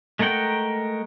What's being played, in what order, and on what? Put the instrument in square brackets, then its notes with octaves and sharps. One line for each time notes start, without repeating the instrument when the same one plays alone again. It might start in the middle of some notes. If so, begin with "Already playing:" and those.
[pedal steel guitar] G#3 A3 A#4 F#5 G5